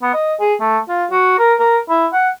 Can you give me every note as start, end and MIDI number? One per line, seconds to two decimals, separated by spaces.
0.02 0.11 59
0.14 0.34 75
0.40 0.54 68
0.60 0.79 57
0.89 1.05 65
1.11 1.34 66
1.39 1.54 70
1.59 1.78 70
1.90 2.07 64
2.13 2.29 78